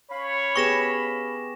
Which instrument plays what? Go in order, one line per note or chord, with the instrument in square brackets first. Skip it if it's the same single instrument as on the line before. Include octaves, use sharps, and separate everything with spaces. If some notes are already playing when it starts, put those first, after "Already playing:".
[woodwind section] C#4 F5 B5 [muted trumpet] C#5
[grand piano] B3 G4 G#4 [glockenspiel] C#6 A#6 E7